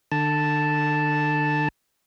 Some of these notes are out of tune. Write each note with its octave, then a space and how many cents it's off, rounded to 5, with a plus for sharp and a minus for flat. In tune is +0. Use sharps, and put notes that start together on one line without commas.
D3 +30 A5 +0